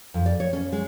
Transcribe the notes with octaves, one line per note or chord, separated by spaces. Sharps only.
F2
D5
C#5
C#4
G#3